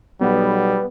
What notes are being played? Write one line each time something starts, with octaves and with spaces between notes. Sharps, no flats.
B1 G3 B3